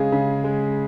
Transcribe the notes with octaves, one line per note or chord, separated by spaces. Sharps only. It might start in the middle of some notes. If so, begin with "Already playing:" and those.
Already playing: C#3 G#3 G#4
C#3
G#3